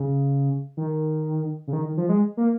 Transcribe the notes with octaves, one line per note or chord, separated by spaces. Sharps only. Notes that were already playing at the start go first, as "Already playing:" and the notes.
Already playing: C#3
D#3
C#3
D#3
D#3
F3
G#3
A#3